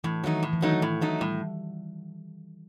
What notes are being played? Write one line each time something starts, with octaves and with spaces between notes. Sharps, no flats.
A2 E3
D#3 F#3 A3 D#4
A2
E3
D#3 F#3 A3 D#4
E3
A2
F#3 A3 D#4
A2 G3